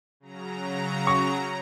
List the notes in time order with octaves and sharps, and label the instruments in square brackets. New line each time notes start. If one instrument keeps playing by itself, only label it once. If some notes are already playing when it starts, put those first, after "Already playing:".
[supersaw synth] C#3 F#3 A#5
[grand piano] C#6